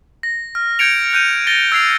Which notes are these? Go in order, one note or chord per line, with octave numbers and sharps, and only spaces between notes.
A#6
F6
G6 G#6 A#6 C#7 D7 F7
F#6 G6 D#7
A6 A#6 G7
E6 G6 G#6 C7 D7 F7